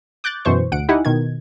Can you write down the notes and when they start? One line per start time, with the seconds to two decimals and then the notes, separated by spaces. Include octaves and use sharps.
0.24 D6 F#6 G6 A6
0.45 F#2 B2 E3 C5 C#6
0.72 D2 F#5 D7
0.89 D#4 E4 G4 F#5 G#5
1.05 B2 D#3 G#6